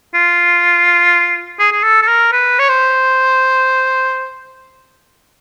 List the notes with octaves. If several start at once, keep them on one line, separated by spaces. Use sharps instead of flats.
F4
G#4
G#4
A4
A4
A#4
B4
C#5
C5